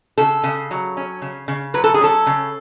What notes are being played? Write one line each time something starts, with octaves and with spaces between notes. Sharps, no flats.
C#3 A4
C#3
F#3
C#4
C#3
C#3
F#3 B4
A4
G#4
C#4 A4
C#3